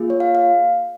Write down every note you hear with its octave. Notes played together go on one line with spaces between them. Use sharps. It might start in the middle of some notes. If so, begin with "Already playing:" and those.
Already playing: A#3 F4 G#4
C#5
F5
F5